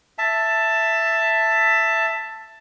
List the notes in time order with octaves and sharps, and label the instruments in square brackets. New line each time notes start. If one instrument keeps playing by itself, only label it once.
[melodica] E5 A5